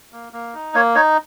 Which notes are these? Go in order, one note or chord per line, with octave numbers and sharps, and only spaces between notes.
A#3
A#3
D#4
A#3 C#5
D#4 C#5